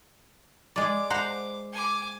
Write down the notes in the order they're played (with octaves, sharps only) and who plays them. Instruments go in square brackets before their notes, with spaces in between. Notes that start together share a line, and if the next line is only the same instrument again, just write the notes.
[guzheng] G#3 D5 [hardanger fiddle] D6
[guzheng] C5 F#5 A#5
[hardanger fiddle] G#5 D6